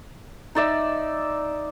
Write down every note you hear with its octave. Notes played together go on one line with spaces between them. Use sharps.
D#4 D5 E5